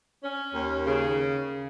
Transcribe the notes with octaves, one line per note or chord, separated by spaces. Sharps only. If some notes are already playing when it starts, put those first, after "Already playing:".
C#4
D#2
C#3